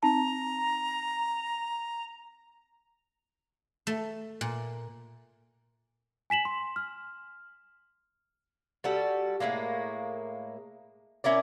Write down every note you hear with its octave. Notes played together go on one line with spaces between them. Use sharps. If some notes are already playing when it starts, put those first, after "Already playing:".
C4 D#4 A5 A#5
A3
A#2
G#5 B6 E7 F#7
C6
F6
G3 F#4 A4
A2 C3 G#3 A#3
C#4 E4 A#4 D5